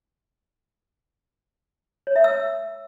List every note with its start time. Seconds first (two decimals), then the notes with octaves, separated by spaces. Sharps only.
2.07 C#5
2.16 E5
2.24 E6